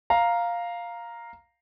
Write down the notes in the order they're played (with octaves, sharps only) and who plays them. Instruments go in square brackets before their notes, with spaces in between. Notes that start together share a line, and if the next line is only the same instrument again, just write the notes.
[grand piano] F5 A#5